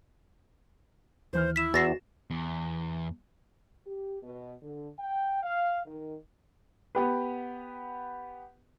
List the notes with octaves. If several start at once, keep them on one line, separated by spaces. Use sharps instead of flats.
D#2 E3 C5 F6
E4 B6 E7
E2 F#4 A6 A#6 C7 E7
E2
G4
B2
D3
G5
F5
D#3
B3 G4 B4